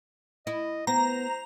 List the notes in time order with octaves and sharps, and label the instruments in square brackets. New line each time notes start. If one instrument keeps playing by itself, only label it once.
[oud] E4 [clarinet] D#5
[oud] B3 [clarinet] C5 [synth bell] A#5